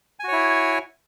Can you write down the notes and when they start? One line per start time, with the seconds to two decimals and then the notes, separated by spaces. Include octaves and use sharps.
0.19 G#5
0.24 F#4
0.28 C#5
0.33 E4